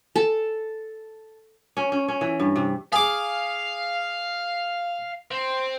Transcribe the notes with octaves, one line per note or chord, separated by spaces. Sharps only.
A4
C#4
C#4
C#4
E3
G2
C3
G#4 F5 D6
C4